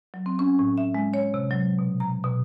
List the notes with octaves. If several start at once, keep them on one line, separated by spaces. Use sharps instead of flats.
F#3
C4
C#4
A2
E5
G#3
C#5
C3
F#3
B2
A#5
B2